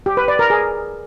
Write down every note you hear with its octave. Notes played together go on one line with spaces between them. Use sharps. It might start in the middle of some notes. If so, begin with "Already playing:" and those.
G4
B4
D5
A#4
G#4